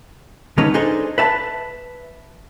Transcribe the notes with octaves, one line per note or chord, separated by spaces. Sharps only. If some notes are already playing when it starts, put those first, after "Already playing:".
D3 G#3 C#4 D#4 B4
D4 D#4 G#4 A4 C5
B4 E5 A5